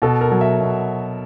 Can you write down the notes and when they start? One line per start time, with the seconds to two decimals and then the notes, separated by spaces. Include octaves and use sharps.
0.02 B2 A4
0.21 A#4
0.32 F#3
0.41 E5
0.61 B2